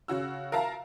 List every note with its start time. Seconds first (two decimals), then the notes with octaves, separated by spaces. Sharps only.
0.08 C#3 F#4 E6
0.52 A#4 E5 F5 A5 A#5